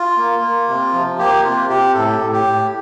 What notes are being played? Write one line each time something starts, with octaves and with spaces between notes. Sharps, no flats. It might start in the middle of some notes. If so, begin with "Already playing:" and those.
Already playing: F4
A#3
A#3
C3
F3
A#3 G4
C3 F4
C3 G4
A2 A4
A2
G4
A2